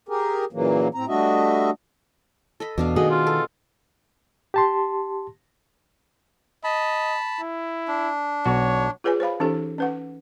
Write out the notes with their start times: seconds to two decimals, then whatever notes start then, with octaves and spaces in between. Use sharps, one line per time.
0.09 G4 G#4 A#4
0.53 A#2 C#3 E3 F#3 A#3
0.94 A2 C4 A#5
1.08 G3 A3 D4 F#4 D#5 E5
2.60 A4 D#5 B5
2.78 E2 B2 D4 F5
2.96 D#3 A3 F#4 G#4 D#5
3.11 F4
3.27 A4
4.54 G4 A5 C6
6.64 D#5 A5 B5
7.41 E4
7.88 D4
8.45 B1 F#4 C#5
9.04 F4 G#4 B4 C#5 G#5
9.20 C5 C#5 F5 B5
9.40 E3 C#4 D#4 G4 A4 C5
9.78 C#4 B4 F#5